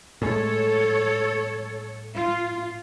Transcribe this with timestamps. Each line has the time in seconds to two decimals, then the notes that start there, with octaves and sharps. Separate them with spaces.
0.22 A2 G#3 A4 C#5
2.14 F4